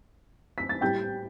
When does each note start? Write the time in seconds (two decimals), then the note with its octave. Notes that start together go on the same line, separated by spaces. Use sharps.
0.58 B6
0.69 A6
0.81 A2 G3 G5 G6